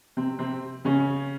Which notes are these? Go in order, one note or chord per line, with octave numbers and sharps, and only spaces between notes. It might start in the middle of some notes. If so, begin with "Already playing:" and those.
C3 C4
C3 C4
C#3 C#4